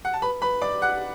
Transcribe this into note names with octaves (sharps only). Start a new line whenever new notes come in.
F#5
A5
B4 B5
B4 B5
D5 D6
F#5 F#6